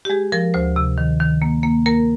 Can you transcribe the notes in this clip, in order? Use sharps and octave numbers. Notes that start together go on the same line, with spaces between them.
G4
G#3 G#4
F3 A#4
D2 C5
C3
D#3
D#3
A#3
A#3
A#3 A#4